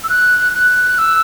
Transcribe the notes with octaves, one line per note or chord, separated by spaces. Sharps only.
E6
F#6
F#6
E6